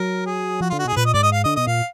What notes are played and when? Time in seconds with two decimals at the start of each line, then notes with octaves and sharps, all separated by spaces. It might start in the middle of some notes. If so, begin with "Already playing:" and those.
Already playing: F#3 A#4
0.26 G#4
0.61 F3 F#4
0.69 D3 F4
0.79 F#4
0.85 B2 G#4
0.93 G#2
0.96 A#2 B4
1.06 D#5
1.14 G#2 D5
1.23 D#5
1.32 F5
1.44 D3 D#5
1.56 B2 D#5
1.67 A#2 F5